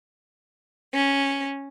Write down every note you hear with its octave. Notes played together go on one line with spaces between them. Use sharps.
C#4